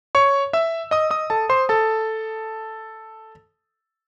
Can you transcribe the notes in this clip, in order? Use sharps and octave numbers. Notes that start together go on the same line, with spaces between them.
C#5 C#6
E5 E6
D#5 D#6
D#5 D#6
A4 A5
C5 C6
A4 A5